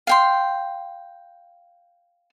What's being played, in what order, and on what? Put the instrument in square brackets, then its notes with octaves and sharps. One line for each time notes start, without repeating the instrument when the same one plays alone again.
[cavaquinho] F5 G5 C6